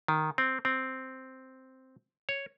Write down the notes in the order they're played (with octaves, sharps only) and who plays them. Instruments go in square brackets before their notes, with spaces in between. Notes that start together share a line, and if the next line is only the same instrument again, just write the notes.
[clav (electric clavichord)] D#3
C4
C4
C#5